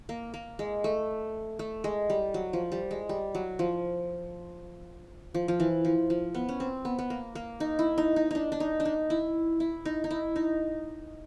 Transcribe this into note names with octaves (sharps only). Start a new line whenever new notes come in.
A#3
A#3
G#3
A3
A3
G#3
G3
F#3
F3
G3
G#3
G3
F#3
F3
F3
F3
E3
F3
F3
B3
C#4
C4
B3
B3
A#3
A#3
D#4
E4
D#4
D#4
D4 D#4
D4
D#4
D4
D#4
E4
E4
D#4
D#4
E4
D#4